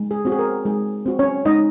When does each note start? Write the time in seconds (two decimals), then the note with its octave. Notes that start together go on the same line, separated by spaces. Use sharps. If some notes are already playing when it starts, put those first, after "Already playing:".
Already playing: G#3
0.11 G#4
0.25 C4 F#4
0.32 G#4
0.39 A#4
0.65 G#3 G#4
1.06 C4 F#4
1.19 C#4 C#5
1.45 G#3 D#4 D#5